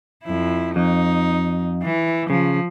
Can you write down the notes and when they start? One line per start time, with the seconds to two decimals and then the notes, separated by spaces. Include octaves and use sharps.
0.24 F2 E4
0.76 F2 D#4
1.83 E3
2.30 C#3 F3